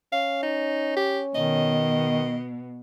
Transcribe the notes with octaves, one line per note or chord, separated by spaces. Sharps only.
C#4 F5
D#4
G4
B2 D#3 D#5